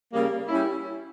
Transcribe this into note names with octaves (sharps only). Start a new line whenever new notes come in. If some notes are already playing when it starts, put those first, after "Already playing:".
C#3 G3 A#3
G3 C#4 E4